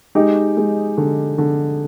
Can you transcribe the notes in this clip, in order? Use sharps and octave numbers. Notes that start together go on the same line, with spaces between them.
G#3 D#4 G4
G#3
D3
D3